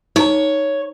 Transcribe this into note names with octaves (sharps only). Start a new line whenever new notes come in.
D#4 C#5 A#5